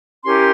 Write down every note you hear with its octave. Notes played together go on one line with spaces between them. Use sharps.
C#4 E4 G4 A#4 C6